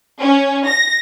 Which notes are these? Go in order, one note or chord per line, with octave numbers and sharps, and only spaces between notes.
C#4
A#6